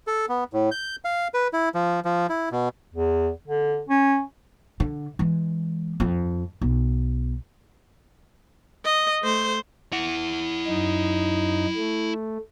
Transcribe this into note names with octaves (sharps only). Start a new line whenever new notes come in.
A4
B3
A2
G6
F5
B4
E4
F3
F3
E4
B2
E2
D3
C#4
D3
E3 G#3
F2
B1
D#5
A3 C5
E4 F#5
F#2 D#4
A3